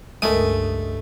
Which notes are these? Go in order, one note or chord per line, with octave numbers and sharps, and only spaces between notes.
C#2 G2 G#3 A3 A#4 D#6